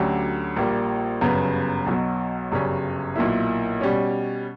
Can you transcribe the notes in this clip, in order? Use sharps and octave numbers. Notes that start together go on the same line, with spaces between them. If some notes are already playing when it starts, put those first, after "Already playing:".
Already playing: D2 D3 F#3 C#4 G4
A#1 A#2 G3 A#3
G1 F#2 C#3 G3 B3
B1 B2 F#3
G1 F#2 C#3 G3 C#4
B1 A#2 A#3 E4
B2 G3 C#4